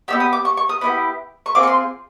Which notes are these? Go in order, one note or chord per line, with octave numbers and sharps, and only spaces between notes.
B3 D#4 G4 E6
D#6
D6
C#6
C#6
D#6
B3 E4 G4 D#6
C#6
C4 F4 G#4 D6
C#6
C6